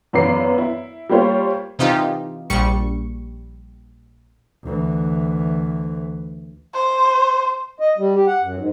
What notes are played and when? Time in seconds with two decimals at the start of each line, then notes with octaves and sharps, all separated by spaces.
0.13 G#1 F#2 E3 B3 D6 C7
0.58 E4
1.09 G3 A#3 F4 G4 C5 C#5
1.79 C3 E3 D#4 F4 G4
2.50 A#1 G3 C#6 C#7
4.64 D2 E3
6.74 C5
7.79 D#5
7.98 G3
8.15 G4
8.27 F#5
8.42 F#2
8.59 G#2